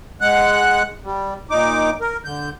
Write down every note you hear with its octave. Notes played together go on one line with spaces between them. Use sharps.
G#3 F#5 F#6
G3
A#2 D#4 D6
A#4
D3 G6